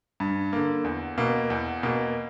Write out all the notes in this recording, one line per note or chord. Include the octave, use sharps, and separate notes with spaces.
G2
D3 A#3
E2
B2 A#3
E2
B2 A#3